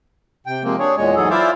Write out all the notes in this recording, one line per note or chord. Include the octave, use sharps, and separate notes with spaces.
C3 G5
C3 F3 G#3 A#3 C4
D4 G#4 C#5
E2 A#2 G#3 C#5
G#2 E3 F#3 G#4 A4
E4 F4 C5 D5 E5 F5